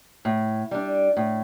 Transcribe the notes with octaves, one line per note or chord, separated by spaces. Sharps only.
A2
G3 D4
A2